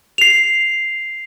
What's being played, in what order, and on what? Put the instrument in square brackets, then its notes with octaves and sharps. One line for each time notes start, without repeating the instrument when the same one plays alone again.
[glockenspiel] C7 F7